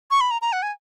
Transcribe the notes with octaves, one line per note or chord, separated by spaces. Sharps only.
C#6
B5
A#5
A#5
F#5
G#5